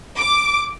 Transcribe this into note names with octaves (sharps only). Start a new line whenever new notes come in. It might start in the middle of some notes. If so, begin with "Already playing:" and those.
D6